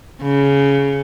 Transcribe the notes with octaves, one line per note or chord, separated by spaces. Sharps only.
C#3